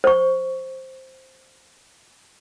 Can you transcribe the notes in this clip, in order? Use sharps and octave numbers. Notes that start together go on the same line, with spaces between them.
C5 C#6